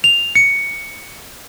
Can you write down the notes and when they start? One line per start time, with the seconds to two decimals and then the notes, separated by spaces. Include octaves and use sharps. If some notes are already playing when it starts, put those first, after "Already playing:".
0.04 F7
0.35 C#7